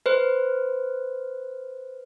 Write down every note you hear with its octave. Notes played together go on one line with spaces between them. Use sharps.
B4 C5